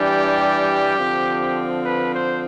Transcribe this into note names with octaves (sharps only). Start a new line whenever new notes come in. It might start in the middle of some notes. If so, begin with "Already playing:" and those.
Already playing: E3 G3 D4 G4
D3 F3 C4
B4
C5